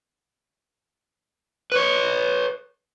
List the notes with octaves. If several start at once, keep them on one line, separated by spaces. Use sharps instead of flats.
B4 C#5